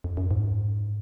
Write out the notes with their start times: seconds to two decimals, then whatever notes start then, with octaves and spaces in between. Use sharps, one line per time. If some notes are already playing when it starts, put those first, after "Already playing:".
0.04 F2
0.17 F#2
0.31 G#2